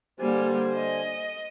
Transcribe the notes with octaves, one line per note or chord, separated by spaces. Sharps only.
D3 G3 A#3 C5 G#5
D#5